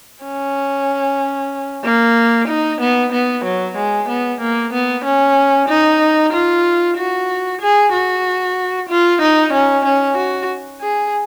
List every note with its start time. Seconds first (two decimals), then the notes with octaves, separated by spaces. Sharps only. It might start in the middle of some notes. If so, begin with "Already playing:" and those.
0.25 C#4
1.84 A#3
2.48 D#4
2.81 B3
3.13 B3
3.45 F#3
3.77 G#3
4.09 B3
4.41 A#3
4.73 B3
5.05 C#4
5.69 D#4
6.33 F4
6.97 F#4
7.62 G#4
7.93 F#4
8.89 F4
9.22 D#4
9.53 C#4
9.85 C#4
10.17 F#4
10.81 G#4